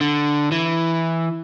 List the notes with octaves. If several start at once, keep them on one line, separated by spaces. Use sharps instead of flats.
D3
E3